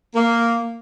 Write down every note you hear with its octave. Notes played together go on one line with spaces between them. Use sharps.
A#3